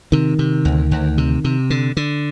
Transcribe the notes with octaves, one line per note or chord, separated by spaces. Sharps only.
C3 D#3
C3
D2
D2
C3
C3
D3
D3